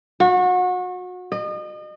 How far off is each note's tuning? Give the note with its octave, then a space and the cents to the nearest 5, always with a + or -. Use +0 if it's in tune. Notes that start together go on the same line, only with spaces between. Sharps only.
F#4 -30
D#5 -35